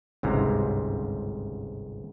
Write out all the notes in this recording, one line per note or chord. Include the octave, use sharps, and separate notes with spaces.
G1 C#2 G#2 C3 A#5